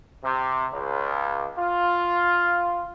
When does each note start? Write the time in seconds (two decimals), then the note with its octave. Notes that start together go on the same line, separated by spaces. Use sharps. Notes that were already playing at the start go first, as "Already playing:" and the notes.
0.24 C3
0.73 C#2
1.58 F4